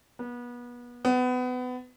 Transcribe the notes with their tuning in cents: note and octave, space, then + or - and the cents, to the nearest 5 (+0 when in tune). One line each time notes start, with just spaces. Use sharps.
B3 -30
B3 +25